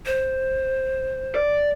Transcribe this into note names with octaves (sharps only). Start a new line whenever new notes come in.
C5
D5